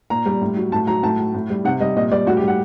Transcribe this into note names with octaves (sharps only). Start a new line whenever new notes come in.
A#2 A#5
G3
A2
F#3
A2 A5
F#3 A#5
A2 A5
F#3
A2
G3
C3 F#5
G3 D#5
A#2 D#5
G3 D5
A2 F#4
G4
G3
F#5